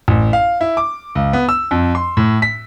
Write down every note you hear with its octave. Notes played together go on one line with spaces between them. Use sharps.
A1
F5
E4
D6
C#2
B3
E6
F2
C6
A2
B6